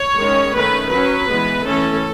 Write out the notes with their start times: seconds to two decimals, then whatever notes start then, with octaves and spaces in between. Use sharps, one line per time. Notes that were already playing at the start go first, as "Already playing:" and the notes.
Already playing: C#5
0.19 D#3 G#3 C#4
0.55 D#3 A3 C#4 B4
0.92 F#3 C#4 B4
1.29 E3 G#3 B3
1.65 E3 A3 C#4 A4